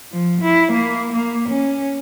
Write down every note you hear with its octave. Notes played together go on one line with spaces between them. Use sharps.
F3
E4
A#3
A#3
C#4